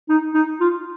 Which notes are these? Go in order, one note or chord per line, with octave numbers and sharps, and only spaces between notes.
D#4
D#4
F4